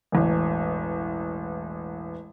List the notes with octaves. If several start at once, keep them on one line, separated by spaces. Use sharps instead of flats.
E1 A1